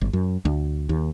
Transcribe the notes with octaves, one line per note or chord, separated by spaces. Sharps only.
G1
F#2
D2
D#2